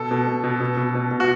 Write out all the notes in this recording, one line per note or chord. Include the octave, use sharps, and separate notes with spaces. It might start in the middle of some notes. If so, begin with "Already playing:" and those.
Already playing: B2 A4
B2
B2
B2
B2
B2
B2
B2
F#4